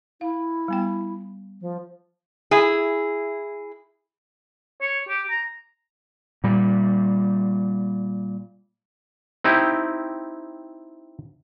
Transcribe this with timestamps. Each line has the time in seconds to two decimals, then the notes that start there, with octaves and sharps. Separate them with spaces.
0.21 E4 F5
0.68 G3 B3 G5
1.61 F3
2.51 E4 G#4
4.81 C#5
5.09 G4
5.30 A#5
6.44 A#2 G3
9.44 C4 D#4 E4 G4